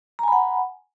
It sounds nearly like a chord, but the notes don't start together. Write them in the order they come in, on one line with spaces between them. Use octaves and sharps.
A#5 G#5 B5 F#5